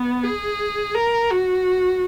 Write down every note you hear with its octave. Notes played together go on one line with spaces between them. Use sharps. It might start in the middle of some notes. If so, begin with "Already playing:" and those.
Already playing: B3
G#4
A#4
F#4